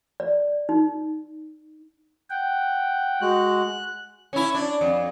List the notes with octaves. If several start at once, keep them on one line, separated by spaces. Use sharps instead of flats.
D5
D#4
F#5 G5
G#3 F#4 F#6
C#4 E4
D4
F2